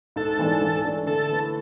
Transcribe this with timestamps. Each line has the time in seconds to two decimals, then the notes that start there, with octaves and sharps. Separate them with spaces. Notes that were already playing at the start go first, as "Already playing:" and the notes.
0.16 G#2 A4
0.39 E3 G#3 D4
0.62 E3
0.85 A3 D4
1.07 D3 A4
1.31 A3 E4 B4